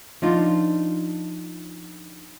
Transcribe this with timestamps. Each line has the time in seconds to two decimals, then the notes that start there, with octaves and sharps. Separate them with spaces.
0.22 F3 D4 D#4 F4